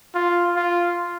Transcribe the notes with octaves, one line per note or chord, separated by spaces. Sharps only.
F4
F4